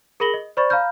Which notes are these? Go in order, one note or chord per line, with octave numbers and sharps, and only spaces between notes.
G#4 A#4 B5 A#6 F#7 G7
D#5
C5 D5 B5 C#6 A6
F5 A#5 B5 F6 G6